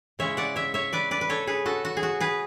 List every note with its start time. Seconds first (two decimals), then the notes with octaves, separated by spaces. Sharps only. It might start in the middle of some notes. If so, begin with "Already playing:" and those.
0.19 C#3 G#3 C#4 E4 C#5 E5
0.37 D5 F#5
0.56 C#5 E5
0.74 C#5 E5
0.93 B4 D5
1.11 B4 D5
1.21 B4
1.29 A4 C#5
1.47 G#4 B4
1.66 F#4 A4
1.85 F#4
1.97 G#4
2.03 F#4
2.20 G#4 B4